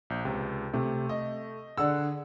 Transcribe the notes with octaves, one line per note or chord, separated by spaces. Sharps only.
A#1 G6
C#2 C3
C3 A3
D#5
D3 G#4 F#5 E6